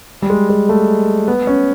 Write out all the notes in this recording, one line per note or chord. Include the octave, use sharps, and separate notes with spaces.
G3
G#3
G#3
A3
B3
C#4